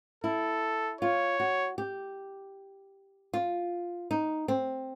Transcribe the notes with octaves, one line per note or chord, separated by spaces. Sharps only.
E4 A4
F4 C#5
F#4
G4
F4
D#4
C4